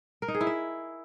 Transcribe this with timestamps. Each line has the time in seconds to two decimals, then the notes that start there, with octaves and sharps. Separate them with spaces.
0.22 A#4
0.28 D#4
0.34 G#4
0.41 E4
0.47 E5